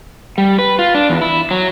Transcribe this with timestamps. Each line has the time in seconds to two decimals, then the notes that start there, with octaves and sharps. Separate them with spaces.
0.38 G3
0.59 B4
0.79 F4
0.94 D4
1.10 E2
1.22 E4
1.51 F#3